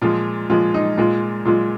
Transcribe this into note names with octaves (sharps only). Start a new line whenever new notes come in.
A#2 F3 G#3 F4
A#2 F3 G#3 F4
D#4
A#2 G#3 F4
A#2 G#3 F4